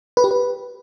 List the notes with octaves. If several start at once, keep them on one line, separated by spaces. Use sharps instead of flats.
B4
G4
B4